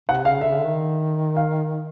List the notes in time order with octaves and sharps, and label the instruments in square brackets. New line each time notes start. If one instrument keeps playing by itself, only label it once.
[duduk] C3 [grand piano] F#5
[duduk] C#3 [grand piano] F5
[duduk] D3 [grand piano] E5
[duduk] C#3
D3
D#3
[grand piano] F5